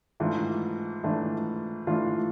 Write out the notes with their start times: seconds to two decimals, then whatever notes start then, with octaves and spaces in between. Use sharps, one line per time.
0.20 G#2 E3 A3 D4 F4
1.04 G#2 E3 A3 D4 F4
1.87 G#2 E3 A3 D4 F4